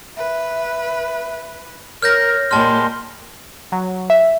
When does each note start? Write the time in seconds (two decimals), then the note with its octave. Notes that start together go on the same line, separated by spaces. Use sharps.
0.17 B4 E5
2.02 A#4 C#5 F6 G6 A#6
2.51 A#2 G3 G#3 A5 C6 F6
3.72 F#3
4.10 E5